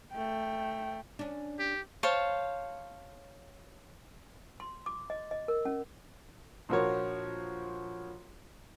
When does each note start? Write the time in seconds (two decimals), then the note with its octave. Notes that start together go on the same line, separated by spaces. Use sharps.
0.12 A3 G5
1.19 C#4 D4
1.59 G4
2.03 C5 C#5 F5 A5
4.60 C6
4.86 D6
5.10 D#5
5.31 D#5
5.48 A#4
5.65 C#4
6.69 A#1 F3 F#4 A#4 C#5